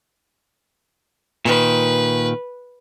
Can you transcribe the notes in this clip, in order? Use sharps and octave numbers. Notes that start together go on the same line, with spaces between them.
A#2 D#3 B4